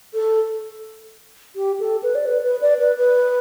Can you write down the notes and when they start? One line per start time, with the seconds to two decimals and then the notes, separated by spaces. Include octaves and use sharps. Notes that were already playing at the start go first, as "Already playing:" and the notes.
0.13 A4
1.55 G4
1.79 A4
2.03 B4
2.15 D5
2.26 B4
2.44 B4
2.61 D5
2.79 B4
2.97 B4